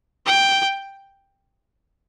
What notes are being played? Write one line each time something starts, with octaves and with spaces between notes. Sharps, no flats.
G5